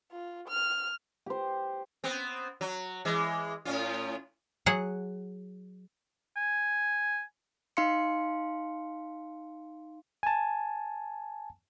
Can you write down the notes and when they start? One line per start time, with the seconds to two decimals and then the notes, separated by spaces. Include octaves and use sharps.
0.11 F4
0.48 F6
1.26 G4 C5
2.04 B3 C4
2.61 F#3
3.05 E3 G#3
3.65 A2 C#4 F4
4.66 F#3 G#4 F#5
6.36 G#5
7.77 D#4 F5 C6 C#7
10.23 G#5 A5